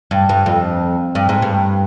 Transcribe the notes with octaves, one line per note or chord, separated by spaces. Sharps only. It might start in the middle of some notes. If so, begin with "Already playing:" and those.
G2
G2
F2
G2
G#2
G2